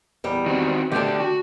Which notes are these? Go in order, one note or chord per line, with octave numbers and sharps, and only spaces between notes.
E2 G3
D#3 C4 F#4
D3 A3 D4 G4 A4
F#4